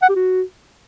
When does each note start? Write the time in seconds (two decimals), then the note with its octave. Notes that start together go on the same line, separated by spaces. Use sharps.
0.02 F#5
0.09 G4
0.15 F#4